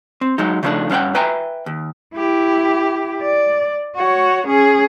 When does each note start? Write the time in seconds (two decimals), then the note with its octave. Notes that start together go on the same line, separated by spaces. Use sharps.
0.21 C4
0.38 F#3 G#3 D#4
0.63 C#3 F3 G3 A3 D4 D#4
0.89 G2 C#4 C5 F#5 G5
1.15 B4 E5 G5 G#5 A#5
1.66 D#2
2.15 E4 G4
3.21 D5
3.95 F#4 C#5
4.48 C#4 G#4